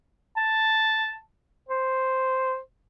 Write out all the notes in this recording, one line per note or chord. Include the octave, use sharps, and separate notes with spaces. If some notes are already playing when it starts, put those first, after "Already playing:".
A5
C5